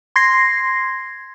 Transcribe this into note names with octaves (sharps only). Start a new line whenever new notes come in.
C6 G#6 A#6 C7